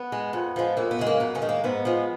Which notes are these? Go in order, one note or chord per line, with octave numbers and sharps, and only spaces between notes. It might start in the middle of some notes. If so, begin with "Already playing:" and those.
Already playing: B3
G#3
F2
F3 G#3
F2 A#3
B3
C#3 G#3
A#3
F#2 B3
C#3 C#4
D#3 G#3
A#3
G#2 B3
F3 G#3